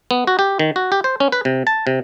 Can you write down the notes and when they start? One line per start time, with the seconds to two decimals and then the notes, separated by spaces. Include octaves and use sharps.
0.11 B3
0.27 F#4
0.39 G4
0.59 D#3
0.76 F#4
0.92 G4
1.04 C5
1.20 C#4
1.32 B4
1.45 C3
1.67 A5
1.87 C3